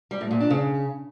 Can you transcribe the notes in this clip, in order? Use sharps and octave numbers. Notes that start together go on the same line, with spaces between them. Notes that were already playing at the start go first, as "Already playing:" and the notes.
G3
A2
A#2
D4
C#3